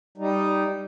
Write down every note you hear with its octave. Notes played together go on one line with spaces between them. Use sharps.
G3 D#4